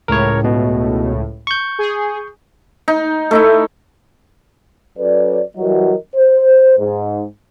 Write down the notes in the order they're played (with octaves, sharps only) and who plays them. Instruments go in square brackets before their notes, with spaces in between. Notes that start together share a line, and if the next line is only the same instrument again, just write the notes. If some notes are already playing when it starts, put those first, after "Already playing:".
[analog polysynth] C#2 A2 [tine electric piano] A#4 C#5
[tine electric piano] B2
C#6 G6
[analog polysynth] G#4
[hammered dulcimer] D#4
A3 D#4 E4
[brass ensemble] F#3 C#4 A4 B4 D5
E3 F#3 G3 F#4 A#4 D#5
C5
G#2